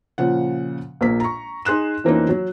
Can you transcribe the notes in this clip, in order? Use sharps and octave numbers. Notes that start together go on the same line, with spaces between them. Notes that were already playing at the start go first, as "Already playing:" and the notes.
A#2 C#3 F3 F#5
A#1 A#2 A#3 B6
A#5 C#6
D#4 G#4 C6 F#6 E7
F2 E3 A#3 C4 C#4 D#4
F#3